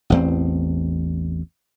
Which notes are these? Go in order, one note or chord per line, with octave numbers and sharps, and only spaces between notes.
A1 E2 C4